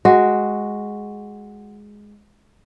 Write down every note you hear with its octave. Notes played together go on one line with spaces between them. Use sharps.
G#3 F#4